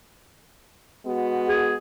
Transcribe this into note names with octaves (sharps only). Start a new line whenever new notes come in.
G#3 B3 F#4
G#4